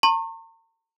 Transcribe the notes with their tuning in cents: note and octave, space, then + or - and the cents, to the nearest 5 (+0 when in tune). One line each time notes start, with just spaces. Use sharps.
A#5 -45 C#6 -40